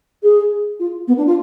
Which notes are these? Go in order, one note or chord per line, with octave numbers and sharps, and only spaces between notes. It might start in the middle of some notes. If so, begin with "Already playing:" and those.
G#4
F4
B3
D4
F4